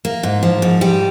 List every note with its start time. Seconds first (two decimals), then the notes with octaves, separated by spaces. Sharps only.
0.05 A#3
0.23 G#2
0.43 F3
0.62 G#2
0.81 G3